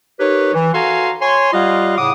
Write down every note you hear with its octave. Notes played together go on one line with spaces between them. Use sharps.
D#4 G4 A#4 B4 C#5
E3
F#4 A4 F5 G#5 A#5 C6
C#5 G#5 C6
G3 F4 G4 D#5 F5 F#5
A2 C#3 F#5 D6 D#6